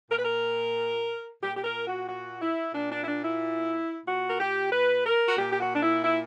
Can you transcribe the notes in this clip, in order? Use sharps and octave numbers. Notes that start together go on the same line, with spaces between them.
A#2 A#4
B4
A#4
A#2 G4
G4
A#4
F#4
F#4
E4
A#2 D4
D4
E4
D4
E4
A#2 F#4
A#4
G4
B4
A#4
F#4
A#2 G4
G4
F#4
D4
E4
E4